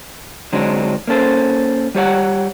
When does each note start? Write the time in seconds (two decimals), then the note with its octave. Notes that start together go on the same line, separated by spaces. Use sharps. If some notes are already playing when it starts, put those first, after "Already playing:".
0.53 D3 F#3 G#3 C4 D4 D#4
1.07 A#3 C#4 A4 C5
1.95 G3 G4 C#5 F#5